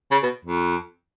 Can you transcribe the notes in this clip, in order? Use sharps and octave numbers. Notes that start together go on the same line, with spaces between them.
C#3
B2
F2